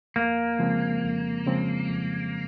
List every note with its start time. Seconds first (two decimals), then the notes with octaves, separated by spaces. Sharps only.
0.16 F2 A#3
0.59 C#3 F3 G#3 C4
1.03 F2
1.46 C#3 F3 G#3 C4
1.89 F2